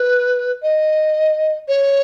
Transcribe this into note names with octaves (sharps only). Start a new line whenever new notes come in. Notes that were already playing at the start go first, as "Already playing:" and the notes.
Already playing: B4
D#5
C#5